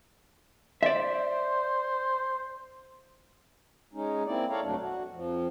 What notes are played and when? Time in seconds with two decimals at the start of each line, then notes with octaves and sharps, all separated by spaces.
0.83 C5 D5 E5
3.91 G#3 C#4 D#4
4.26 A#3 C4 E4 D5
4.50 A4 C#5 D5 F5 A#5
4.62 F2 B2 F#3 A3 D4
4.80 F#4
5.12 F2 F3